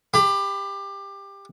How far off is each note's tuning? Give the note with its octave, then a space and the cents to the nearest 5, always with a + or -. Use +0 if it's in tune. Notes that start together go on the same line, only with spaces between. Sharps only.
G4 +20 B5 +30